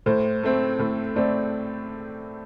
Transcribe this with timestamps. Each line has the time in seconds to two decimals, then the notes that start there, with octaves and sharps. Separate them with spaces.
0.06 A2 C5
0.43 A3 C4
0.79 A2 A4
1.16 A3 C4 D5